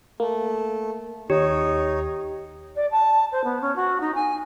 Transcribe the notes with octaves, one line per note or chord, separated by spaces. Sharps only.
A3 A#3
D#2 D#4 G4 C#5
D5
A5
C5
B3
C#4
F#4
D#4
G#5